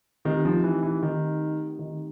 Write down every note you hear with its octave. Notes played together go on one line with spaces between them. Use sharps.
D#3 A3 C4 D#4 G4
F3
E3
E3
D#3
D#3